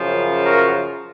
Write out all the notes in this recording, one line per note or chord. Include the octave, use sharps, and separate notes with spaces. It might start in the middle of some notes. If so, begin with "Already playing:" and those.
Already playing: F#2 C#3 F3
F#4 A#4